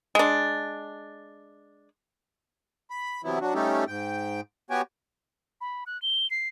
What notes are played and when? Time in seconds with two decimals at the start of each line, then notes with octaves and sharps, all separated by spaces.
0.15 G#3 D4
2.90 B5
3.24 C3 E3 F#3 B3 E4
3.41 F#3 D4 F#4
3.54 G3 A3 C#4 D#4 G4 A4
3.88 G#2 G5
4.70 B3 F#4 G4 C#5 G5 G#5
5.61 B5
5.87 F#6
6.02 G7
6.31 C7